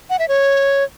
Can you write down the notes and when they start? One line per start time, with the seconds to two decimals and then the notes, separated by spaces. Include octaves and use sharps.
0.10 F#5
0.19 E5
0.28 C#5